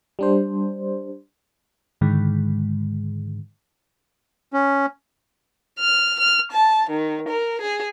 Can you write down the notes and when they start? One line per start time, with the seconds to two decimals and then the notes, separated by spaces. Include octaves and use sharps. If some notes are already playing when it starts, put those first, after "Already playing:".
0.19 G3 D4 C5
2.01 G#2 D3 D#3 G#3
4.53 C#4
5.79 F6
6.20 F6
6.52 A5
6.90 D#3
7.30 A#4
7.62 G#4